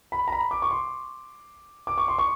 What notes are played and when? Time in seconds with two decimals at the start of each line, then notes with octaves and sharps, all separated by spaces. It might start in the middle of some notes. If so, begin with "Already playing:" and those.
0.12 B5
0.28 A#5
0.32 B5
0.51 D6
0.62 C#6
0.71 C6
1.87 D6
1.98 C#6
2.08 C6
2.18 C#6